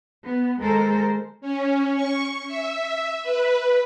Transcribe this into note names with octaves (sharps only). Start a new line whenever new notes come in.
B3
D#2 G#3 A4 A#4 C5
C#4
C#6
E5
B4